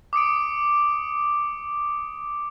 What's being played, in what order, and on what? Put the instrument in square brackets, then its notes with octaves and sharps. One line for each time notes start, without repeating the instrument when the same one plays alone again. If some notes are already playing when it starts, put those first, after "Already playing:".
[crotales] D6 D#6 C#7 D7